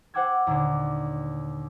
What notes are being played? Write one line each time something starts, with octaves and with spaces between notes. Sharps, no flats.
C5 F#5 G5 D6 E6 G#6
D#2 A#2 D3 D4